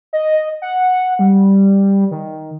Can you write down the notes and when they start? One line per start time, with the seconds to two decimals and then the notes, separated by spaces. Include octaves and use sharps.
0.13 D#5
0.62 F#5
1.19 G3
2.11 D#3